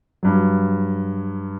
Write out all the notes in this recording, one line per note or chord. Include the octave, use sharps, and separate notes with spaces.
G2 F#3